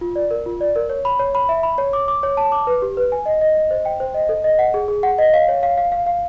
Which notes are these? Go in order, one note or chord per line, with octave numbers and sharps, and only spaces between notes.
F4
D5
A#4
F4
D5
A#4
C#5
B5
C#5
B5
E5
B5
C#5
D6
D6
C#5
A5
D6
B4
G4
B4
G#5
D#5
D#5
D#5
C5
G5
C5
D#5
A4
D#5
F#5
G#4
G#4
F#5
D#5
F5
C#5
F5
F5
F5
F5